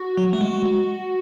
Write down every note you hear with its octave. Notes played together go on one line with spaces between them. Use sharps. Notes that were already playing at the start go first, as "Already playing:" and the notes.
Already playing: F#4
F#3
A3
G#3
F#4